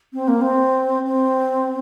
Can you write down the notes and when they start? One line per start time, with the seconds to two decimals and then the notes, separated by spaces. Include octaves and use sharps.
0.13 C4
0.28 A#3
0.41 C4
1.05 C4